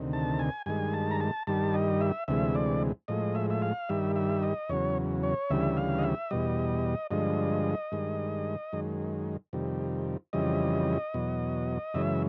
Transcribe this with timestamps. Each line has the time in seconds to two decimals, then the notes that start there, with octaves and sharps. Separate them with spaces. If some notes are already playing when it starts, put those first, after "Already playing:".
Already playing: D2 C3 D#3
0.13 A5
0.39 G#5
0.66 G2 D#3 G#3 G#5
0.93 A5
1.11 A#5
1.20 A5
1.47 G2 D#3 G3 A5
1.74 D#5
2.01 E5
2.28 D2 C3 E3 G#3 E5
2.55 D5
3.08 A2 F3 G#3 D#5
3.35 E5
3.50 E5
3.62 F5
3.89 G2 D#3 G3 E5
4.16 E5
4.43 D#5
4.69 E2 C#3 F#3 C#5
5.23 C#5
5.50 D2 C#3 E3 G3 E5
5.77 F5
5.99 D#5
6.03 E5
6.31 E2 B2 G3 D#5
7.11 G2 D3 F3 G#3 D#5
7.92 G2 D#3 G#3
8.73 F#2 D#3 G#3
9.53 F2 C3 D#3 G3
10.33 F2 C#3 E3 G3 D#5
11.14 E2 B2 F#3
11.94 F#2 C#3 E3 G#3 E5